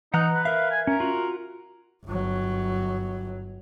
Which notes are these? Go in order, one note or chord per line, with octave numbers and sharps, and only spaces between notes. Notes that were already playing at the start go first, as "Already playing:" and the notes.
E3 D#4 F#5 A#5 F#6
B4
A#4 E5 F5
G#5
C#4 A#4
F4 F#4
G1 F#3